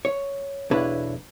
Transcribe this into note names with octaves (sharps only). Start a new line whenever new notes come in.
C#5
B1 E2 D4 E4 B4 C#5